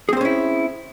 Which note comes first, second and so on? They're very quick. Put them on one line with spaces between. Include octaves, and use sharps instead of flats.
G#4 C4 C5 C#4 E4